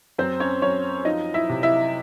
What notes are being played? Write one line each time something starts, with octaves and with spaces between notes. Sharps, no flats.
F#2 C4 C5
C#4 C#5
F#2 C#4 C#5
F3 D#4 D#5
E4 E5
C3
E4 E5